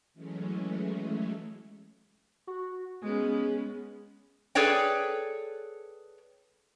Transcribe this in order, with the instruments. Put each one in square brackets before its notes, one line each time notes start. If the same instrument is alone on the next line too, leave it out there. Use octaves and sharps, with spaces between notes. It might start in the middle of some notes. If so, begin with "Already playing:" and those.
[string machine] E3 F#3 G#3 A3 C#4
[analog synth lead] F#4
[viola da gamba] G#3 B3 C#4 [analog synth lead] G#4
[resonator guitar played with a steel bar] G#4 A4 B4 C#5 D5 G5